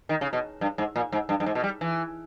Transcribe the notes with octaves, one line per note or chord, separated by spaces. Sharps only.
D#3
C#3
B2
G2
G#2
A#2
G#2
G2
G2
G#2
B2
G3
E3